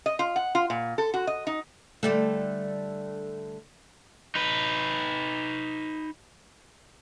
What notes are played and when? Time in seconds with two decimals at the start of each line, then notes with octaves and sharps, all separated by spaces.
0.06 D#5
0.19 F4
0.36 F#5
0.55 F4
0.70 A#2
0.98 A4
1.14 F#4
1.27 D#5
1.47 D#4
2.03 D3 G3 A3
4.35 D#4 B4